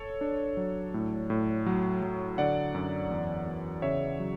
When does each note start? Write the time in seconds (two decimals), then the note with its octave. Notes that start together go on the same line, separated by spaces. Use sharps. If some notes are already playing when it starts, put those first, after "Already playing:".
Already playing: A4 C#5
0.21 D4
0.57 F#3
0.94 A2
1.30 A2
1.66 F#3
2.02 F#3
2.38 D3 D5 F#5
2.75 F#2
3.11 E2
3.47 B3
3.82 C#3 C#5 E5
4.20 F#3